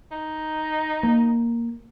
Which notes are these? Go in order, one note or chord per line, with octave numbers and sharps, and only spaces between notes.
D#4
A#3